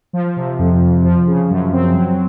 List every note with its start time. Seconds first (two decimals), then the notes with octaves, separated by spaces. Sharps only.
0.13 F3
0.36 C3
0.59 F2
0.81 F2
1.04 F3
1.27 C#3
1.50 F#2
1.73 C4
1.95 F#3